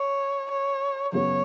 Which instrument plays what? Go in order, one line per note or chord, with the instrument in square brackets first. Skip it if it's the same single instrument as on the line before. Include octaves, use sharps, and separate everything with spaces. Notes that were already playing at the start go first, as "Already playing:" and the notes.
Already playing: [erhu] C#5
C#5
[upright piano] F#2 C#3 F#3 B3 F#4 [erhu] C#5